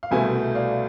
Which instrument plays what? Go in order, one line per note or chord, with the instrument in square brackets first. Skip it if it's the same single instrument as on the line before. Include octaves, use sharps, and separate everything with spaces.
[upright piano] F5
C2 B2 A3 E5 G#5
D5 F5